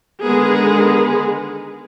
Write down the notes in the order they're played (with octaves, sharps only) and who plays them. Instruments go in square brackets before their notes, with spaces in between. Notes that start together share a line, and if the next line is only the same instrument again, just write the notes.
[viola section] D3 D#3 G#3 B3 G#4 A#4